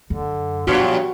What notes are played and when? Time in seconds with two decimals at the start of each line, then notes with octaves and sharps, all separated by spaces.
0.10 F#2 D3
0.67 G2 A#2 F3 F4 F#4 C#5